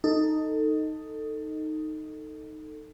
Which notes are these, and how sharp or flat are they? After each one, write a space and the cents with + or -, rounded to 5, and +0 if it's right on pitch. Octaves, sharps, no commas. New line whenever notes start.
D#4 +0 A4 +15